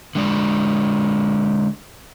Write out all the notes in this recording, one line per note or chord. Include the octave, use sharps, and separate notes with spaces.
D3 G#3 D5